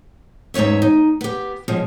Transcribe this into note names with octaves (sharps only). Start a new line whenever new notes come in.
E2 G#2 C#4 C#5 E5
D#4
B3 G4
B2 F3 G#3 C#4